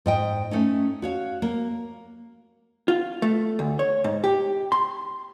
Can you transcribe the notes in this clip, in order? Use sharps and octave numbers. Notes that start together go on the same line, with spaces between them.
G#2 D#5 G5
A3 C#4 D#4
F#4 C#5 F5
A#3
F4
A3
D2
C#5
G#2
G4
C6